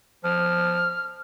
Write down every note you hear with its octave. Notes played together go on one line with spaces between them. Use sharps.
F3 F6